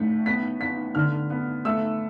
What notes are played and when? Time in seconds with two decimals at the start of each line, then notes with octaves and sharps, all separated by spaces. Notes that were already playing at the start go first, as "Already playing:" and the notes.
Already playing: A2 A3 B6
0.26 B3 B6
0.60 B3 B6
0.95 D3 F6
1.30 B3
1.65 A3 E6